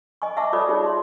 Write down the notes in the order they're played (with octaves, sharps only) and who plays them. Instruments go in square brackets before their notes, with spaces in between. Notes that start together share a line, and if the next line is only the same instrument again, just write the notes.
[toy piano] D#5 G#5 C#6
E5 F#5 A5 C#6 D6
F4 A4 C#5 D5 D#6
D#4 F4 G#4 C#5
E5 C6